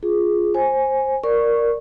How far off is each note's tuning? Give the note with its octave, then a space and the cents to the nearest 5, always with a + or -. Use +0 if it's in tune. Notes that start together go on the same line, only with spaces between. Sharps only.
F4 +0 G#4 +0
C5 +20 G#5 +0
A#4 +0 D5 +0 C#6 +0